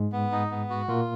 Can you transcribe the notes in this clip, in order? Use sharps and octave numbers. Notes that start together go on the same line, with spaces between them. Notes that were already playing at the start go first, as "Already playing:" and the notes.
Already playing: G#2 G#3
B3
D#4
B3
F#4
A#2 A#3 F4